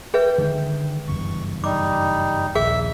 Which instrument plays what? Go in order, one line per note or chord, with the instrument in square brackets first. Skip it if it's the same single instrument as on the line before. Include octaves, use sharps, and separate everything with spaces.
[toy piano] G#4 B4 E5 [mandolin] G5
[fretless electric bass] D3 D#3 G#3
[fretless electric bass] F#1 E2 G2 [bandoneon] C#6
[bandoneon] G3 D#4 [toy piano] D6
[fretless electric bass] A#1 D#2 [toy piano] G#4 [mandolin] E5